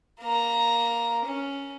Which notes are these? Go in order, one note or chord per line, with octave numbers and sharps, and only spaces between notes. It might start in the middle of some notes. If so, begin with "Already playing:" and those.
A#3 A#5
C#4